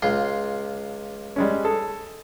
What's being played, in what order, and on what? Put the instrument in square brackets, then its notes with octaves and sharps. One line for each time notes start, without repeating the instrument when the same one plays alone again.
[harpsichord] C#2 F4 C6
[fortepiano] G3 G#3 C#4
G#4 A4